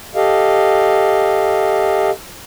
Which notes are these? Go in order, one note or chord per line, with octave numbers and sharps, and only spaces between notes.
G4 A4 D#5 F5